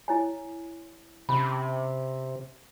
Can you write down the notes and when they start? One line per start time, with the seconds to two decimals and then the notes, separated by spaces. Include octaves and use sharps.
0.08 E4 C#5 G#5
1.29 C3 C#4 B5